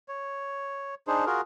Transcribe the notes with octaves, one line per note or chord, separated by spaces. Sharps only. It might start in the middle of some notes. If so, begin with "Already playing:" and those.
C#5
D4 D#4 G#4 C5
F4 F#4 G#4 A#4